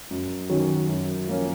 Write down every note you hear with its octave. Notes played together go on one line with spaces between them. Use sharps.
F#2
D#3 F#3 C#4
F#2
F3 A#3 C#4